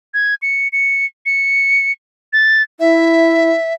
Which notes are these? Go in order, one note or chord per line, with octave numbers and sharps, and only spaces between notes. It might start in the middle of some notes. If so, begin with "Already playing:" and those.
G#6
C#7
C#7
C#7
A6
E4 E5